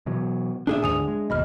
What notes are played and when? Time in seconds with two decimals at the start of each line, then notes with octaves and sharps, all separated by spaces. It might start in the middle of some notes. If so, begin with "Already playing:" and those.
0.06 B2 E3 F#3
0.67 A1 A#2 D4 G#4 E5
0.83 D2 G#2 D3 G#5 D#6 F7
1.08 G#3
1.30 F#1 D#2 B2 D#5 B5 F6